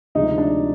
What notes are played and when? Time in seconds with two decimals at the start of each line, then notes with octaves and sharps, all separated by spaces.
0.15 D2 C3 F3 G#3 D#4
0.38 D4